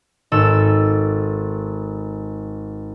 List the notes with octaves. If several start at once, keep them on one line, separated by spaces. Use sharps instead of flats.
G#1 A4 E6